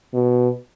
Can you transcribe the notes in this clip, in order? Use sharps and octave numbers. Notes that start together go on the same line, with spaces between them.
B2